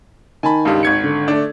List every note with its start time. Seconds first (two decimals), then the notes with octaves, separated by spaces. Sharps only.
0.43 D#3 G#5 A5 B5
0.65 C#2 G2 G3
0.83 G#1 G#6 C#7
1.03 D3
1.28 A3 D4